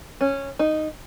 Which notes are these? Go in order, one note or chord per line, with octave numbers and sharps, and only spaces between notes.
C#4
D#4